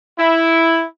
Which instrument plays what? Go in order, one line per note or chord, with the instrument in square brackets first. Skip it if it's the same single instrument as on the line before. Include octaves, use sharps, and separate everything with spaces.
[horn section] E4